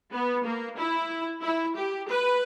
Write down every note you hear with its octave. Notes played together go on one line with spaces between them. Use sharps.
B3
A#3
E4
E4
G4
B4